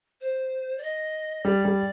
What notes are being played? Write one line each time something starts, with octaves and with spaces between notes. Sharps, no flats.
C5
D5
D#5
G3 D5
G3